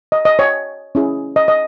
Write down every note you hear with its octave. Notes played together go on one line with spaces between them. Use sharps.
D#5
D#5
C#5
C#4 E4 G#4
D#5
D#5